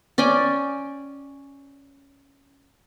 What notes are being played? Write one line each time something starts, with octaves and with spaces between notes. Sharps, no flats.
C#4 D5 G5 G#5